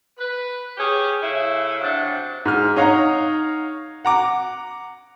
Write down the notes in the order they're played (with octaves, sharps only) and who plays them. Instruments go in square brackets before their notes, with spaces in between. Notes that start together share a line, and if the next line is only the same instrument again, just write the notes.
[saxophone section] B4
C#4 G4 G#4
C#3 A3 E4
C3 F#3 D4
[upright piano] G#2 F6
D#4 C#5 F5 F#5 A#5
F#5 A#5 D6